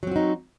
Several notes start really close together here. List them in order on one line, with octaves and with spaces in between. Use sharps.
F#3 C4 F#4 D#4